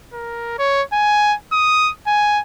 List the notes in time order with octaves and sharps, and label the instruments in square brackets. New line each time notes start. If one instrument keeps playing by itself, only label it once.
[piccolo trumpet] A#4
C#5
G#5
D#6
G#5